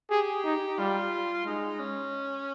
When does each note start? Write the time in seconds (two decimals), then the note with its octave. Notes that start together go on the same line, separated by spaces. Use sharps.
0.11 G4 G#4
0.45 D#4
0.78 G3 F4
1.45 G#3 D#4
1.79 C#4